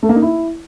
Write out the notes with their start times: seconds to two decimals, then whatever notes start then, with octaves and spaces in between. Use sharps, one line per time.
0.03 A3
0.09 A#3
0.16 D#4
0.22 E4